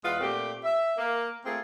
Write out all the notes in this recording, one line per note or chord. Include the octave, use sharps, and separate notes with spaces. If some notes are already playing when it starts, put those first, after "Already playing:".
E2 G#3 F4 B4 F#5
A#2 A3 C4 G4
E5
A#3
A3 A#3 C4 F4 G#4